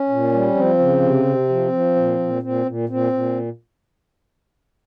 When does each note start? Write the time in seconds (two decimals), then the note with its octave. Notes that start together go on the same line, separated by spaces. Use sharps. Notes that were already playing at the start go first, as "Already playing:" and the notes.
Already playing: C#4
0.09 A#2
0.32 G3
0.55 F3 C4
0.79 C#3
1.02 C3
1.25 C3
1.49 F3
1.72 F3
1.96 A#2
2.19 A#2
2.43 A#2 C4
2.66 A#2
2.89 A#2 C4
3.12 A#2